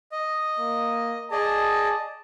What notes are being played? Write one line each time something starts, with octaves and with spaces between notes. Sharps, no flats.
D#5
A#3
G#4 D5 D#5 A5